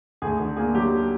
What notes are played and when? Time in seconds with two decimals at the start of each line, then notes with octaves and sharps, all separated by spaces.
0.22 D2 G#4
0.40 D3
0.56 A#3 G#4
0.74 F#3 G4